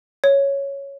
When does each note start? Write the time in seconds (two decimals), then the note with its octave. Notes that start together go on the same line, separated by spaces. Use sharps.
0.24 C#5